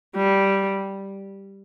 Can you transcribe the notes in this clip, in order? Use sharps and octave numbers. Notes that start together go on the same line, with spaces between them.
G3